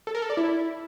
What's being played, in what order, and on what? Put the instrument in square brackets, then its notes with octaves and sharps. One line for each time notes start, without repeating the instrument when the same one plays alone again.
[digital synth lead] A4
A#4
A4
D5
E4